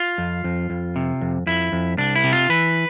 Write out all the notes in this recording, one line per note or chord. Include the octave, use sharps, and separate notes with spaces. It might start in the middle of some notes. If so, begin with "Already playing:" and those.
Already playing: F4
F2
F2
F2
C3
F2
F2 E4
F2
C2 D4
E4
C3
F4
E3 B4